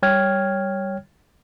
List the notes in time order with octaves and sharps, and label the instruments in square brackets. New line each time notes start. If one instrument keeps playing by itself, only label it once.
[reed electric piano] G3 C#5 G5 F6 G#6